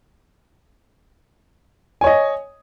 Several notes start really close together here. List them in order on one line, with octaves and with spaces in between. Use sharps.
G#5 C#5 D#5